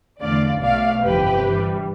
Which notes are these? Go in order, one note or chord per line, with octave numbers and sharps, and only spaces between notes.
E2 D3 A3 D5 F5
B1 B2 A3 D5 F5
G1 F2 C3 E3 G4 B4
G2 E3 G3